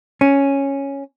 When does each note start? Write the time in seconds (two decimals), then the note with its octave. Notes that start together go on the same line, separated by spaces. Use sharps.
0.21 C#4